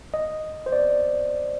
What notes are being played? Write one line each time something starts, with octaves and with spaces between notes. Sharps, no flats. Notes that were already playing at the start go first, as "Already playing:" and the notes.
D#5
C5
D5